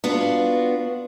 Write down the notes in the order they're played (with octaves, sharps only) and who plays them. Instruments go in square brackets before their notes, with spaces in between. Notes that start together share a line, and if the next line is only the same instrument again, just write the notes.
[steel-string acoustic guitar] B3 D4 F4 F#4